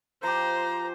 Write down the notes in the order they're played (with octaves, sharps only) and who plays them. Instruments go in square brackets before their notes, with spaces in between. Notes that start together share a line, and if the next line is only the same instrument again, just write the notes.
[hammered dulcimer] F3 G4 [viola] C5 [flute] A#5